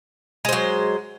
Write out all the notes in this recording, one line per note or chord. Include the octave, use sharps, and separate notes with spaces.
F#3 G#3 C5